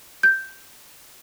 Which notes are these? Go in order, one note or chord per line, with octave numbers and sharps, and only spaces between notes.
G6